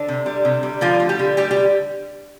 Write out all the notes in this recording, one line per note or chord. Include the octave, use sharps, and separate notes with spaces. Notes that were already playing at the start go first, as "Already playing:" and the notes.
Already playing: D3 D4
C3
G3
C3
G3
D3 F3 F4
A3
G3 G4
D3
G3 A3 G4
G3 G4
D3